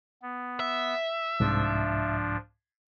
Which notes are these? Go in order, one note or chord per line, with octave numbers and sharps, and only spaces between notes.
B3
E5
C2 G#2 F3 D4